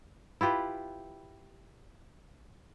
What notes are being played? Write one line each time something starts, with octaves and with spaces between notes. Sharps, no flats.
E4 F4 G4 B4